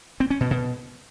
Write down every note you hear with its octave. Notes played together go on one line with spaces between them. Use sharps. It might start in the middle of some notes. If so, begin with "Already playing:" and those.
C4
C#4
B2
B2